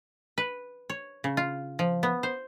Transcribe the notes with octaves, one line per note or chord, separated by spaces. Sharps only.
B4
C#5
C#3
F4
F3
B3
C5